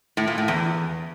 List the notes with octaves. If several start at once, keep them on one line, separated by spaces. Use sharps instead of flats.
A2
A#2
A2
E2